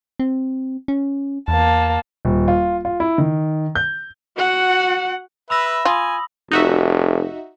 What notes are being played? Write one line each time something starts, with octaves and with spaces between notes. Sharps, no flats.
C4
C#4
E2 A#3 A5
D#1
F4
F4
E4
D#3
G6
F#4 F#5
B4 E5 B5 E6 A#6
F4 G#5 B5 D#6 F#7
F1 D#4 F#4 E5